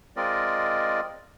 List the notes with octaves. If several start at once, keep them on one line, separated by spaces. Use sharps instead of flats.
G#3 C4 F4 A#4 D5 D#5